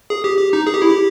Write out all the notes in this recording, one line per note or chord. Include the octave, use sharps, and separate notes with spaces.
G#4
G4
G4
D#4
G#4
G4
E4
G4